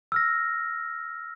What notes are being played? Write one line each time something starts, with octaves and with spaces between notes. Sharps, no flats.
E6 F6 A#6